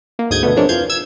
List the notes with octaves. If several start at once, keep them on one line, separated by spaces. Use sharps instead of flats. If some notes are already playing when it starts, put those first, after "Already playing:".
A#3
D2 G#2 D#6 G6 G#6
B2 D3 A3 B3
F3 G#3 A#3 C4 D4 C#5
F2 E3 F4 F5 G6 G#6
E6 G#6 E7